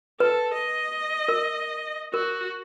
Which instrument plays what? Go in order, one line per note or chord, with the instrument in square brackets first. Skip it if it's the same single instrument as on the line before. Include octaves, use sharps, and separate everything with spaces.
[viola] A4 [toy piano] B4
[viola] D#5
[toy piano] A#4
[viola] F#4 [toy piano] A#4